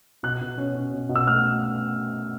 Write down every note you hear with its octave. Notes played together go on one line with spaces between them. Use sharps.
B2 F#6
B2
C#4
C#4
B2
B2
E6
A3 F6